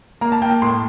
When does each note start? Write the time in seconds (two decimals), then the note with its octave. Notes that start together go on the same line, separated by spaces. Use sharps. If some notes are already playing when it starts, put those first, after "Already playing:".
0.21 A#3 A#5
0.32 A5
0.42 A#3 G5
0.62 A2 C6